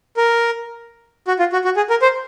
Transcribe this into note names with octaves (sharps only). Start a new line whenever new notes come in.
A#4
F#4
F4
F#4
F#4
G#4
A#4
C5